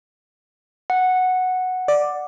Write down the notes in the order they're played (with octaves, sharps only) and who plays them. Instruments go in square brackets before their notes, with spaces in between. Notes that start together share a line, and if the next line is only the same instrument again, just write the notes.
[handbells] F#5
[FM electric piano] D5